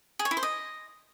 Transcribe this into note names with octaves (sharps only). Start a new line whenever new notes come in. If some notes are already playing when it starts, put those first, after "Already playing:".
G#4
C#5
E4
C5
D#5